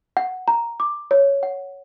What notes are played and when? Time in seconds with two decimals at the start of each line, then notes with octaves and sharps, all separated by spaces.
0.17 F#5
0.48 A#5
0.80 D6
1.11 C#5
1.43 F#5